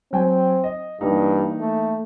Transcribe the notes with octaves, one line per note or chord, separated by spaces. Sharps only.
F#3 C4 G5 G#5
D#5
G2 E3 A#3 D#4
A3